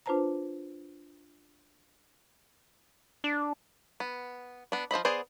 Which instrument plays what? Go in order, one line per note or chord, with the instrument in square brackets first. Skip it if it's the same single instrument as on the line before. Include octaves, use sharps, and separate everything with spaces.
[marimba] D4 F4 B4 C5 A5 A#5
[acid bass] D4
[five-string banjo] B3
B3 D4
F3 C5 D#5 B5
B3 G#4 C5 D5